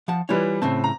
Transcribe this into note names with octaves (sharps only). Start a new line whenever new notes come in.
F3 F#5 A5
E3 G3 E4 F4 B4 C#5
A2 C#3 C4 A5
A#5